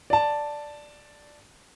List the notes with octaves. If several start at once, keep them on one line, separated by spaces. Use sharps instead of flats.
D5 A5